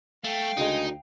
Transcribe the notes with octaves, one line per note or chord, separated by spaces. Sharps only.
A3 F5 G5
D2 C#3 G#3 D#4